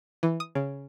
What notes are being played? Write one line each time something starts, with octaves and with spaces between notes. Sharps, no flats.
E3
D#6
C#3